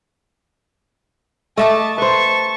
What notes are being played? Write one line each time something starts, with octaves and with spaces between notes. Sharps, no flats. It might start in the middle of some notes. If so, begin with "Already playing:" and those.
A3 D#5 E5 A5 D6
B4 C5 A5 C#6